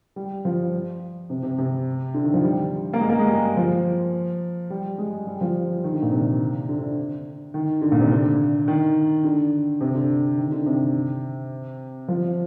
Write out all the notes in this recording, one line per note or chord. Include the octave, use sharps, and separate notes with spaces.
G3
F3
C3
C3
C3
D3
D#3
F3
G3
A#3
G#3
A#3
G#3
G3
F3
G3
G#3
G3
F3
D#3
D3
A#2
C3
D3
D3
D#3
D3
A#2
C3
D3
D#3
D3
C3
D3
D#3
D3
C3
F3